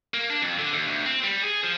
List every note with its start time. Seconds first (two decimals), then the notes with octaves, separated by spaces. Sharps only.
0.14 A#3
0.30 D4
0.42 F2
0.59 D3
0.74 D#2
0.88 D2
1.06 C4
1.24 G3
1.43 G#4
1.64 F3